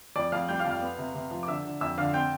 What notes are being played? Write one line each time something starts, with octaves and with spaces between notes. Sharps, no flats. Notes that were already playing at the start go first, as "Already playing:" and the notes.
F2 D5 D6
F2 F5 F6
G3 G5 G6
F5 F6
F2
F5 F6
B3
C3
C3
F3
D6
D3 E5 E6
D3
F2 E5 E6
D3 F5 F6
C4 G5 G6